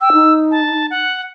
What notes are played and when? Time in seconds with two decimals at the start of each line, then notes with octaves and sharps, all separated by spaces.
0.01 G5 E6
0.13 D#4
0.51 A5
0.90 F#5